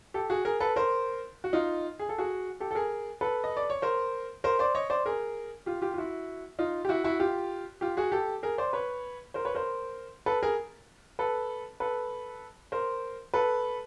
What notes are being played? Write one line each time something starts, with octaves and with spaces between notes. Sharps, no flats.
G4 A4
F#4 G#4
G#4 A#4
A4 B4
A#4 C5
F#4
D#4 F4
G#4
A4
F#4 G#4
G4 A4
A4
G#4 A#4
A4 B4
D#5
D5
C#5
A#4 C5
A#4 C5
C5 D5
C#5 D#5
C5 D5
G#4 A#4
F4 G4
F4 G4
F4
E4 F#4
D#4 F4
G4
E4 F#4
E4 F#4
F4 G4
F4 G4
F#4 G#4
G4 A4
G#4 A#4
C5 D5
B4 C#5
A#4 C5
B4 C#5
A#4 C5
A4 B4
G#4 A#4
A4 B4
A4 B4
A#4 C5
A4 B4